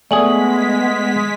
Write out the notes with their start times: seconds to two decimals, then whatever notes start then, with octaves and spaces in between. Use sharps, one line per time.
0.11 G#3 A3 B3 G#4 D5 G#5 B6 F#7